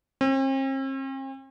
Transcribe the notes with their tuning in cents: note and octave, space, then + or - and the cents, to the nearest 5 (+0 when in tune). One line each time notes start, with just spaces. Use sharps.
C4 +45